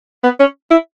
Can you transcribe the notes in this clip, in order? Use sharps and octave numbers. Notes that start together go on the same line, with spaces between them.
B3
C#4
E4